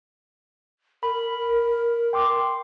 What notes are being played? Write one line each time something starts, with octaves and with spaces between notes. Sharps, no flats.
A#4 B5
G5 C6 D6